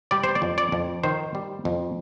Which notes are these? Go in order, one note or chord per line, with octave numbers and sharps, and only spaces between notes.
G3 D5
C5
D5
F2
D5
F2
D#3 C5
G3
F2